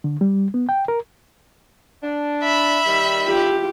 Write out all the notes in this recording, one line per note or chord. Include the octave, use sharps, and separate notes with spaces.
D3
G3
B3
G5
A#4
D4
E5 B5
D#3 G3
F4 G4